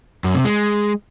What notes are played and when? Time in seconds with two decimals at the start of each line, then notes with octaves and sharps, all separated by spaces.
0.24 F#2
0.35 C3
0.45 G#3